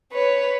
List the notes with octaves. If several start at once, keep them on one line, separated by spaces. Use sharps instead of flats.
B4 C#5